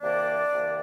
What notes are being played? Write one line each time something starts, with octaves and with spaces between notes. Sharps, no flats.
C2 C3 D#3 A#3 D4 D5
C2 C3 D#3 A#3